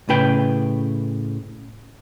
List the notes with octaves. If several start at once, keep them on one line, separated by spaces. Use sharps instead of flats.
A2 C#3 B4 G5